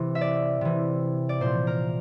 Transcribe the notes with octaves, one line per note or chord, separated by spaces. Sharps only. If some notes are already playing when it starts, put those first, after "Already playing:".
Already playing: C3 E3
E5
D5
C3 E3
D5
A#2 F3 C5
A#4